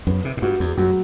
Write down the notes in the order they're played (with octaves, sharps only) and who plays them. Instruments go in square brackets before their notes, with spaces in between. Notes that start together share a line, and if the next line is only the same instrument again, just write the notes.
[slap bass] F#2 [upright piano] B3
[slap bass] C3
A2
[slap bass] G2 [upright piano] F#4
[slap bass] E2
[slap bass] F#2 [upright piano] F#3